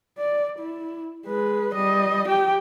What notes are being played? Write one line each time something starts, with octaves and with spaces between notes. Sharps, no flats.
D5
E4
G#3 B4
G3 D#5
G4 G5